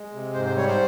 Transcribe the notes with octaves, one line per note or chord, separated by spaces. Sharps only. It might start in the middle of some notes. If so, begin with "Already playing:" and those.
Already playing: G#3
C3
G#2 C5
C5
G3 C#5
C5